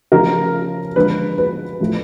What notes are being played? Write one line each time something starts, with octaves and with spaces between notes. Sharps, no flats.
C#3 F3 A3 A#4
D3 F3 G#3 B4
B4
A2 F3 A3